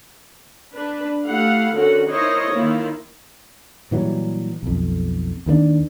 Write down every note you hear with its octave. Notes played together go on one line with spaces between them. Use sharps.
D4 B4
A3 E4 G4 F5 F#5
D3 C#4 F#4 A4 A#4 F#5
D#4 E4 A#4 C5 C#5 D#5
D#3 A#3 E4 F4
A#2 E3 F#3 G3
B1 F2
D#2 D#3 G#3 D4